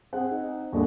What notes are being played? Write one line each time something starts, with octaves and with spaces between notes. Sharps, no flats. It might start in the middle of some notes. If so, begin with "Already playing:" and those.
C4 G#4 F#5
D#4
D#2 D3 G#3 A#3